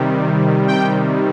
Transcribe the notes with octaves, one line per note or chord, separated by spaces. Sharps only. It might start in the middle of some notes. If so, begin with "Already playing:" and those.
Already playing: C3 D#3 G3
G5